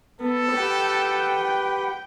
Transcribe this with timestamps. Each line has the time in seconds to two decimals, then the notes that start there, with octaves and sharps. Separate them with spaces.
0.20 B3 A4
0.55 G4 B4 F#5 G5